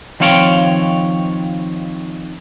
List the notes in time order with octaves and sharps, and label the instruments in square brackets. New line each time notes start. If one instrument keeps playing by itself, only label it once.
[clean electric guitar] D#3 F3 C4 C#5 F5 G5